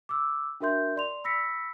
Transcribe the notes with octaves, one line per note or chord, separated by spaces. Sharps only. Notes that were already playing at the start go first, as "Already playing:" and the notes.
D6 E6
D4 F#4 A#4 E5 C6 G6
D5 C6 F7
B5 E6 A#6 B6 C#7